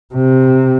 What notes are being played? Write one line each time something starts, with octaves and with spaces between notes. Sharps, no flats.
C3